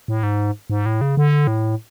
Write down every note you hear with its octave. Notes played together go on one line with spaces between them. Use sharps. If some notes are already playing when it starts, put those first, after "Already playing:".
A2
G#2
G#2
A2
C#3
D3
A2